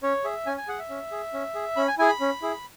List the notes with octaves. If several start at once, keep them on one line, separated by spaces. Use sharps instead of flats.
C#4 C#5
G#4 E5
C#4 G#5
G#5
G#4 F#5
E5
C#4
G#4
C#4
G#4
C#4 B5
G#5
E4 G#4 G#5
B5
C#4
E4 G#4